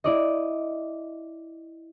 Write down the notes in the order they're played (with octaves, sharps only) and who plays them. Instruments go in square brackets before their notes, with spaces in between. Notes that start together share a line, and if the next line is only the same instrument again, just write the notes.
[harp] E4 D5 D#5